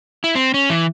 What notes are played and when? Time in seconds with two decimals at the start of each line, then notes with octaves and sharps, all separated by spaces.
0.24 E4
0.35 C4
0.54 C#4
0.70 E3